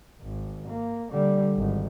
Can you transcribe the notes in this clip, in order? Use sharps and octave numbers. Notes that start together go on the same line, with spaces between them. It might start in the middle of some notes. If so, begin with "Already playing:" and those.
G#1
A#3
D3 G3
G#1